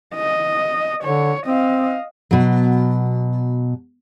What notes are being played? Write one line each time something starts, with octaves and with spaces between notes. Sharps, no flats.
D#5
D3 C#5
C4 D#5 F5
B2 F#3